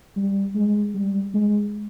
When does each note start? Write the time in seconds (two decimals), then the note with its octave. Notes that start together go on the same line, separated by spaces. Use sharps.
0.16 G3
0.55 G#3
0.94 G3
1.34 G#3